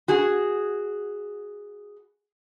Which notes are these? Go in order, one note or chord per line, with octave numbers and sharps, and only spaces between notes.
F#4 G#4